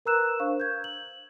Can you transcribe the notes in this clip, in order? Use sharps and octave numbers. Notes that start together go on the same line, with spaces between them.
A#4 B4 A#5 E6 F#6 E7
D4 C5 F5 C#6
G6 G#6
F#7